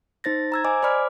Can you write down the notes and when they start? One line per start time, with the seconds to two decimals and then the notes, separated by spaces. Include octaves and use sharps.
0.24 D#4 C5 A6 A#6
0.52 A#5 E6 G#6
0.65 C5 D#5 G#5 D6
0.82 C5 D5 B5 D6 F6